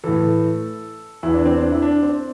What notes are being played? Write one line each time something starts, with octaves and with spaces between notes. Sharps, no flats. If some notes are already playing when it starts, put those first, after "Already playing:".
A2 E3 A4
E2 E3 E4
D4
C4
D4
E4
D4
C4